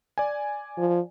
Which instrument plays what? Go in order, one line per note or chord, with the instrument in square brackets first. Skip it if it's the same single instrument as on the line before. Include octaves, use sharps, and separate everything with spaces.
[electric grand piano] D5 G#5
[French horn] F3